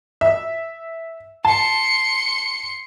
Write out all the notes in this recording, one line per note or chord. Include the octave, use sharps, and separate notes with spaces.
E5
A5 C6 C#7